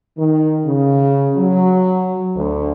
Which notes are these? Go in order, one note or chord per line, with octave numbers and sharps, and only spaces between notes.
D#3
C#3
F#3
D2